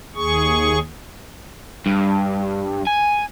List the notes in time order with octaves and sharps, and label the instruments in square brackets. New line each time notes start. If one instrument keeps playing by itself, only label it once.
[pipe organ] D#2 G#4 C#6
[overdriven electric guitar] G2
G#5